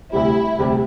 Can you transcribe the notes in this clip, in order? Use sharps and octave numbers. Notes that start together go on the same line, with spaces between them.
D2 C3 G3 E4
D2 C3 G3